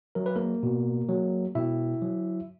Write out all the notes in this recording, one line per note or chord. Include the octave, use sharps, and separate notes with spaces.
F#3 A#4
B4
A#3 A#4
B2
F#3
B2 E4 E5
F#3